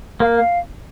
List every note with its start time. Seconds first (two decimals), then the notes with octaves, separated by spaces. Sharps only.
0.20 A#3 F5
0.36 F5